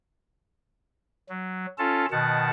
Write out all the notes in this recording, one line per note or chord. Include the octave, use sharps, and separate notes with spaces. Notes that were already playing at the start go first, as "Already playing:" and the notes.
F#3
C#4 F4 A4 A5
B2 D#3 F#5 A5